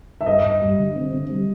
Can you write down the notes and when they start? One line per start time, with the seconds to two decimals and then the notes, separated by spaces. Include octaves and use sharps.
0.21 E5
0.26 G2 D#5
0.44 G2
0.62 G3
0.79 D3
0.96 C4
1.13 D3
1.30 G3